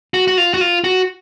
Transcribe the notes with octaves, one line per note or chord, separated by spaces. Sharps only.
F#4
F#4
F4
F#4
F4
F#4